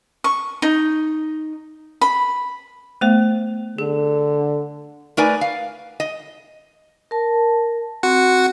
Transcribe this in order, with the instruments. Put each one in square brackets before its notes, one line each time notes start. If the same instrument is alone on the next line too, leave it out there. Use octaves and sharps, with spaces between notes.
[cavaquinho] C#6
D#4
B5
[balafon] A3 B3 C5
[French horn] D3 [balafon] G#4
[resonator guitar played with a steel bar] A3 D#4 A#4 B4 D5 G#5
F5
D#5
[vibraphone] A#4 A5
[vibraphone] C4 [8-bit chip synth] F#4 F#5